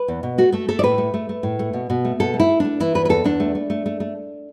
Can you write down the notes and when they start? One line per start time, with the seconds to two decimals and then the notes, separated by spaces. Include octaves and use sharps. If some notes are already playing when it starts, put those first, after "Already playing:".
Already playing: B4
0.08 E2
0.23 B2
0.38 A3 F#4
0.52 A3 A4
0.69 A3 A4
0.79 D5
0.83 A2 B4
0.98 A3
1.14 A3
1.29 A3
1.43 A2
1.59 A3
1.73 B2
1.90 B2
2.05 A3
2.20 B2 A4
2.34 A3
2.40 E4
2.49 A3
2.60 A3 D4
2.80 E3 E4
2.95 E2 B4
3.05 B4
3.09 E2 A4
3.24 E2 D4
3.40 A3
3.55 A3
3.70 A3
3.86 A3
4.00 A3